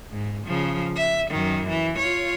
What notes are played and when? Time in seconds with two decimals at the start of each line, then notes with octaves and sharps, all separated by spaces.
0.12 G#2
0.47 C#3 F3
0.97 E5
1.31 F#2 D#3
1.69 E3
1.99 F4 C#5